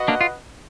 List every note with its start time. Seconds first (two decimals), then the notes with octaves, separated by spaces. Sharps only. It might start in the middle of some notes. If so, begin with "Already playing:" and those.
Already playing: F#4 B4 D#5 F#5
0.08 A#3 D4
0.21 F4